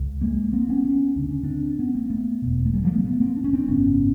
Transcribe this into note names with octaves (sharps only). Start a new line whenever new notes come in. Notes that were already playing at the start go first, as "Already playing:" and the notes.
Already playing: C#2
G#3 A#3
A#3 C4
B3 C#4
B3 C#4
D2 C#3 D4
C#4
C4 D4
B3 C#4
A#3 C4
A3 B3
E1 E2 B2
A3
F#3 G#3
F3 G3
A3 B3
A3 B3
A#3 C4
D4
C#4
C4 D4
G#1 F#2 C#3 B3 C#4